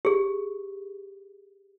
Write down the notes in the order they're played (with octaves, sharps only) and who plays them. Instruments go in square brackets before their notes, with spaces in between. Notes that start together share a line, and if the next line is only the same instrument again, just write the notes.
[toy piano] G4 G#4